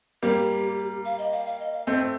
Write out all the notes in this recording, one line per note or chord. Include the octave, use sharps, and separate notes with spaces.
G3 A#3 G4
F5
D#5
F5
F5
D#5
F5
A3 C4 D#5
C5